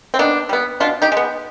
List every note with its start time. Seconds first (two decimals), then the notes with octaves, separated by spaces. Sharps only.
0.14 C4
0.19 D#3 B3 D4
0.49 G3 B3
0.80 B2 D4 F4
1.02 D#4 G4
1.12 G#3
1.17 B3